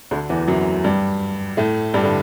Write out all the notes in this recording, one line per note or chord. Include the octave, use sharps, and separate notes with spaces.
D2 D3
E2 E3
F#2 F#3
G2 G3
A2 A3
G2 G3
D3